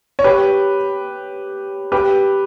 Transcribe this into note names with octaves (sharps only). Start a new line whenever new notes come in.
C#5
G4 B4
G4 B4